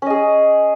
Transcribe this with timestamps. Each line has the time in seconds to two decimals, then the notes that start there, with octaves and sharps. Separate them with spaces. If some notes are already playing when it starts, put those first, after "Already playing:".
0.02 C#4
0.06 D#5
0.10 G#4